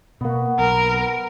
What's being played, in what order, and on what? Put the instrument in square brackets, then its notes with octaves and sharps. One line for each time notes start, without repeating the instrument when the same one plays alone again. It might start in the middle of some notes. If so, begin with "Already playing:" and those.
[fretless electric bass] B2 A#3 [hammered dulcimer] B3 F#4
[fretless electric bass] B1 [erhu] A#4